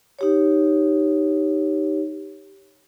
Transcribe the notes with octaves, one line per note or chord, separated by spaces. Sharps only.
D#4 G4 C#5